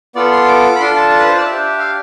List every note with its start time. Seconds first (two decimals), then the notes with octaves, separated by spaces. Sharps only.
0.15 B3 F4 A4 D5
0.32 C6
0.48 D6
0.76 B5
0.80 D4 F4 A4 C6
0.97 A5
1.10 A4
1.19 B4
1.28 C5
1.37 D5
1.45 D4 E5
1.51 G4
1.79 F5